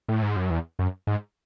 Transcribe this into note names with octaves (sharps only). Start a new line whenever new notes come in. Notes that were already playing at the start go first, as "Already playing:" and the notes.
A2
G#2
F#2
E2
F#2
G#2